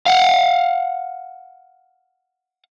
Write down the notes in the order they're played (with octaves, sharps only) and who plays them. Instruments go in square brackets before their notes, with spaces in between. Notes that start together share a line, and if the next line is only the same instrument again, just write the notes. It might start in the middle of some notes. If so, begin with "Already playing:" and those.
[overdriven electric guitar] F5 F#5